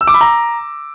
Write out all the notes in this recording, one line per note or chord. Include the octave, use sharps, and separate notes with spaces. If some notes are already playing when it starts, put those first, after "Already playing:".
E6
D6
B5
A#5